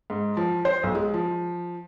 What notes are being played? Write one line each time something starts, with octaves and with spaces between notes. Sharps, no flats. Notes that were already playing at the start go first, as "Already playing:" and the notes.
G#2
F3
C5
B1
G#3
F3